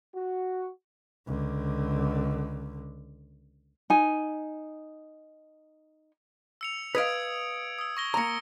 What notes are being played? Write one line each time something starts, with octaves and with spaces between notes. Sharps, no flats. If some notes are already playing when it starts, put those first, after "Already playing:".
F#4
C#2 D3
D#4 G#5
E6 C#7 F7
B4 D#5 F5 D#6 G#6 D7
D#6 E6
C#6 A#6 G7
A#3 A#5 A#6 C#7